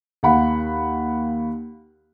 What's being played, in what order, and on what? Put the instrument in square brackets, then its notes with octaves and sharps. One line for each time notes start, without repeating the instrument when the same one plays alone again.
[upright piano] D#2 F5 F#5 B5